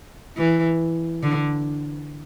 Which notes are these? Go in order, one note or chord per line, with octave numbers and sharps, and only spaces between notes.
E3
D3